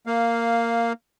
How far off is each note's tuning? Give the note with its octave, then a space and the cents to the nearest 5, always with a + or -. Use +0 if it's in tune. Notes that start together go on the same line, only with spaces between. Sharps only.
A#3 -10 F5 +0